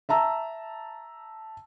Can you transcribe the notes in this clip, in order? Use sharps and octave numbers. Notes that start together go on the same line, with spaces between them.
E5 A5 A#5 E6